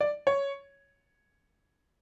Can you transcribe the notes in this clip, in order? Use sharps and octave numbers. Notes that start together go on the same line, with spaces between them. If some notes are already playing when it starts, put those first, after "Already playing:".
D5
C#5